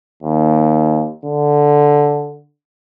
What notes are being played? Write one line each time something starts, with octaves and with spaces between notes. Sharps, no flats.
D#2
D3